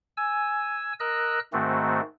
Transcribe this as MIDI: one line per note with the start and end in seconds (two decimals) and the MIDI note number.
0.17 0.93 80
0.17 0.93 88
1.00 1.39 70
1.00 1.39 75
1.00 1.39 88
1.00 1.39 90
1.53 2.01 44
1.53 2.01 51
1.53 2.01 57
1.53 2.01 60
1.53 2.01 66